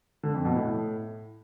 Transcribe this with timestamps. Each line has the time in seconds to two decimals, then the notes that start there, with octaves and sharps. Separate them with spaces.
0.23 D3
0.34 F2
0.45 B2
0.56 A2